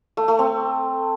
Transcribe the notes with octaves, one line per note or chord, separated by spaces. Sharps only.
A3
A3
C4